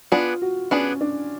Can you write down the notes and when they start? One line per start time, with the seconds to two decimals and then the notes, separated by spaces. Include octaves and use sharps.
0.12 B3 D4 F4 G#4
0.42 F#4
0.71 B3 C#4 D4 G#4
1.01 D4